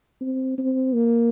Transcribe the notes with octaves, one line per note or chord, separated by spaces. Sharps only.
C4
C4
A#3